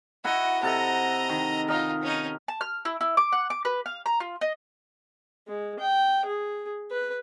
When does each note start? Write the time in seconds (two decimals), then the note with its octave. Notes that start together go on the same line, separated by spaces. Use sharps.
0.24 E4 F#4 D#5 F#5 A#5
0.63 C3 A4 D#5 A#5
1.29 D#3
1.68 D#4 F4 A#4 D#5 A#5
2.02 C#4 D#4
2.48 A5
2.61 F6
2.85 E4
3.01 E4
3.17 D6
3.32 F#5
3.50 D6
3.65 B4
3.86 F5
4.06 A#5
4.20 F4
4.41 D#5
5.47 G#3
5.79 G5
6.26 G#4
6.91 B4